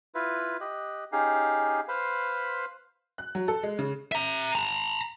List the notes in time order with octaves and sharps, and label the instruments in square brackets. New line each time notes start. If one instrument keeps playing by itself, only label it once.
[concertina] E4 F4 B4
G4 D#5 F#6
C#4 D#4 G4 G#4 F5
B4 C5 F5 B5 C6
[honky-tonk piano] F#6
F#3
A4
G#3
C#3
[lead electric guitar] E5 A#5
A5 A#5